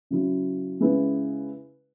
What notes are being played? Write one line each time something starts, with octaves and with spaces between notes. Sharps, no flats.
C#3 F#3 E4
C#3 G#3 E4 B4